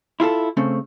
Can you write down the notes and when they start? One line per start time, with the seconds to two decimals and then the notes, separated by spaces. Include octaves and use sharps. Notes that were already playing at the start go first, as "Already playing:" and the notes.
0.20 E4 F4 G4 A4
0.57 C#3 A3 C4 C#4